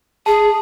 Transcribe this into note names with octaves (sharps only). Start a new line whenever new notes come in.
G#4 A5